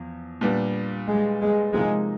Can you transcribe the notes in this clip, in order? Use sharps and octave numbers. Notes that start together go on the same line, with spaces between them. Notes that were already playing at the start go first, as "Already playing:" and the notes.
Already playing: E2 F3
A#2 G3 B3 D4
G#3
G#3
C3 F3 G#3 A#3 D#4